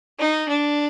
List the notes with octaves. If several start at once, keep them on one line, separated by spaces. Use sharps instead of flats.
D#4
D4